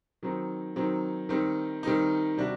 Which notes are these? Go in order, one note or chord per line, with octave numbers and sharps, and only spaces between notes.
D#3 F#3 C4 D#4
D#3 F#3 C4 D#4
D#3 G3 C4 D#4
D#3 G3 C4 D#4
C3 G3 D4 F#4